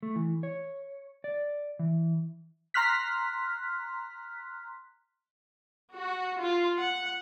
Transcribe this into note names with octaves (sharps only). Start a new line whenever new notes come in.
A3
E3
C#5
D5
E3
A#5 C6 F6 F#6 B6
F#4
F4
F#5